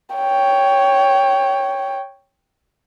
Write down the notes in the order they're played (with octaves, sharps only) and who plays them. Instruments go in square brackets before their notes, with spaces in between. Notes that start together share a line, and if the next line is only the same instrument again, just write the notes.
[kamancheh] C#5 G5